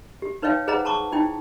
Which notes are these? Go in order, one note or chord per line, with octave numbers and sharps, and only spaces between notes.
G4
D#4 B4 C#5 D#5 F5 G5
G#4 B4 C5 D#5 F#5 A#5
A5 A#5 C#6 D6
D#4 E4 G5